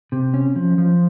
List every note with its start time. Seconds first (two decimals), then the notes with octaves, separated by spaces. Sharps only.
0.12 C3
0.34 C#4
0.56 F3
0.78 F3